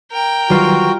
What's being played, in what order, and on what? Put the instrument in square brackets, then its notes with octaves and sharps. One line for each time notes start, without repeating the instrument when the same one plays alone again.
[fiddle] A#4 G5
[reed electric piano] D#3 F#3 B4 [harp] G3 F4 [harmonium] F#4